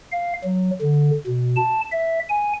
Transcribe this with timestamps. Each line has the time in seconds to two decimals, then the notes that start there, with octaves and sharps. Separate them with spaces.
0.12 F5
0.44 F#3
0.82 D3
1.27 B2
1.56 A5
1.91 E5
2.29 G#5